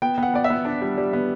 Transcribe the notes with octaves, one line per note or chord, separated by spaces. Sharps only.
B3 G5
B3 F#5
B3 D5
E5
B3
D4 D5
G3
G3
B3